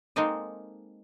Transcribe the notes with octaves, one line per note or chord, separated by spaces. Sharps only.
G#3 A#3 C4 D#4 A4 D#5